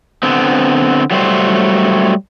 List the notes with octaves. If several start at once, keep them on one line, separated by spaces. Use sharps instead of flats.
D3 B3 C4
F#3 G3 A3 C5